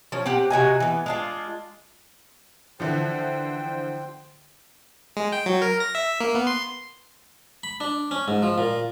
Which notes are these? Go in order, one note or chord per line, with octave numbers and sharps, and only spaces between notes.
F3 C#4
C4 G4 F#5
C3 F#4 D#5 G#5
E3 B3
G#3 D4 F4
D3 E3 F3 C5 G5
G#3
G5
F#3
A#4
A#6
E5
A#3
B3
C6
B5
D4
C#4
G#2
F3
A#2